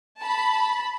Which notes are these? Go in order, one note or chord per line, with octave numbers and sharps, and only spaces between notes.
A5 B5